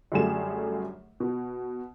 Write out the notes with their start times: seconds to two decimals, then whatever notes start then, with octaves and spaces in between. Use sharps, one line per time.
0.12 F#2 D3 G3 A3 G#4 E7
1.20 B2